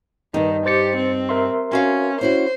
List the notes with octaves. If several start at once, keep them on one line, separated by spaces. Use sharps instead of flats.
G2 D#3 B3 D#4
G4 C5 A6 C#7
C4
A#4 E5 C6
B3 C#4 F#4 F5
C#4 E4 F#4 C5